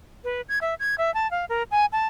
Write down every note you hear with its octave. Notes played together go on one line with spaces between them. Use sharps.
B4
G#6
E5
G#6
E5
A5
F5
A#4
G#5
A5